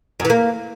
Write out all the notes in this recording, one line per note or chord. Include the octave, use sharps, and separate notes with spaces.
F#2
E3
A#3